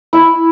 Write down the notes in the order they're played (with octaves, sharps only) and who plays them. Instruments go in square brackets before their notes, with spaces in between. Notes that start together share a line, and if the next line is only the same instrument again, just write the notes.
[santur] E4